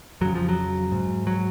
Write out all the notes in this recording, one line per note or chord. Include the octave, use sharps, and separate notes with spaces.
F2 C#3 F#3
F3
F#3
G#2
F#3